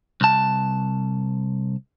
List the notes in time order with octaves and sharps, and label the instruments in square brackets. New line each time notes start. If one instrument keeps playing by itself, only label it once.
[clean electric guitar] C2 A5